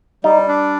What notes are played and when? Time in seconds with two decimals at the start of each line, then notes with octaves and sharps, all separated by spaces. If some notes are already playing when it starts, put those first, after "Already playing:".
0.24 G3 D#4
0.48 D4